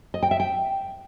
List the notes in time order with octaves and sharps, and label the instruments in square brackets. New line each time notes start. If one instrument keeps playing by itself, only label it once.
[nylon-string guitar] D#5
G5
E5
G5